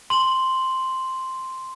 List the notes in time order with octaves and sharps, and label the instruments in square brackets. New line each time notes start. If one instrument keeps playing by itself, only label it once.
[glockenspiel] C6 F#7